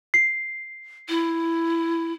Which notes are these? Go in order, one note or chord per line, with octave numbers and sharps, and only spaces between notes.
C7
E4